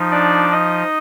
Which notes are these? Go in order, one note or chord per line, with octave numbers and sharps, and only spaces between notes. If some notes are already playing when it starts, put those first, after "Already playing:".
Already playing: F3 D#4
D4 D5
D#4 D#5